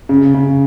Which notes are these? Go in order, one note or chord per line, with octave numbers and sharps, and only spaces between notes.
C#3
C#3